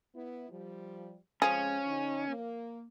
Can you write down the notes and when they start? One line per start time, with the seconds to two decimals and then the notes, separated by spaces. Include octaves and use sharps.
0.15 B3 E4
0.50 F3 G3
1.42 F2 F3 G#3 C#4 G#4
1.87 D3 D#4
2.28 A#3